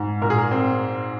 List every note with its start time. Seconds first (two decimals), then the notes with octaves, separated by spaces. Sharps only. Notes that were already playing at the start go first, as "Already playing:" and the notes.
Already playing: G#2
0.21 A#2 A#4
0.30 G#4
0.38 A#4
0.51 C4